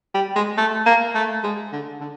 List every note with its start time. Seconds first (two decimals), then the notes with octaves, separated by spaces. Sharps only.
0.14 G3
0.36 G#3
0.57 A3
0.86 A#3
1.15 A3
1.43 G#3
1.72 D3
2.00 D3